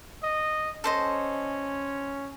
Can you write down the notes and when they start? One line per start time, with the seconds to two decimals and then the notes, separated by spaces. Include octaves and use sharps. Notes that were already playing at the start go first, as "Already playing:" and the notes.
0.23 D#5
0.84 C#4 A4 C5 D#5